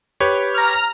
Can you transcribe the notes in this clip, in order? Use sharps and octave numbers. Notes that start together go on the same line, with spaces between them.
G4 B4 C#5
A#5 F6